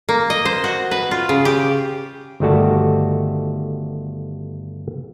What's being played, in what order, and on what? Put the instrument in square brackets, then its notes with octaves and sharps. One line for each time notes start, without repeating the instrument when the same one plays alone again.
[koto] A#3
D#5
C5
F#4
B4
F4
C#3
G4
[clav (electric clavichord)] G1 D#3 G3 A3 F#4 A5